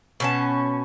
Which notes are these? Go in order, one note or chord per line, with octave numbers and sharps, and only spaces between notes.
B2 C#4 A5